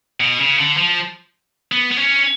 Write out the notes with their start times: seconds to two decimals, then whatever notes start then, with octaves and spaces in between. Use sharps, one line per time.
0.20 B2
0.39 C#3
0.58 D3
0.77 F3
1.72 B3
1.92 B3
1.98 C#4